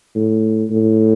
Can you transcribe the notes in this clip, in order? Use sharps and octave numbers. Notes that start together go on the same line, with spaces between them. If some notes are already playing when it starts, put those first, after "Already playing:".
A2
A2